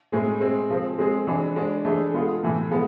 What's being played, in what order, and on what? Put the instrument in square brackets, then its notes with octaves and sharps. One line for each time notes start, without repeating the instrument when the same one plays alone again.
[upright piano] A2 G#3 C4 G#4
G#3 C4 G#4
F3 G#3 C4
G#3 C4 G#4
E3 G#3 D4
G#3 D4 G#4
E3 A3 D4 G#4
G#3 B3 F4 G#4
A2 E3 A3
F3 G#3 B3